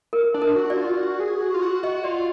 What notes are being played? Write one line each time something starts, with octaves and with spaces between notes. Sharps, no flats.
A#4
D4
A#4
F#4
D5
F4
F#4
G#4
F#4
F4
F#4
F#4 D#5
F4 D5